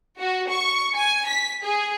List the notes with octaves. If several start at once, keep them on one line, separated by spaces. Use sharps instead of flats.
F#4
C#6
G#5
B6
G#4